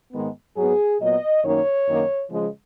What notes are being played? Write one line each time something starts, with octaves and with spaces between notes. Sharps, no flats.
G#2 D#3 G#3 B3
G#2 F#3 B3 G#4
A#2 F#3 B3 D#5
F#2 D#3 A#3 D#4 C#5
F#2 D#3 A#3 D#4
C#3 F3 G#3